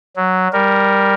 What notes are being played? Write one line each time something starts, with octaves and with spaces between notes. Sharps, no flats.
F#3
G3 A#4